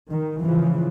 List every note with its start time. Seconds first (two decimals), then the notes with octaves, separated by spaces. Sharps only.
0.10 D#3
0.41 G#2 C#3 E3 F3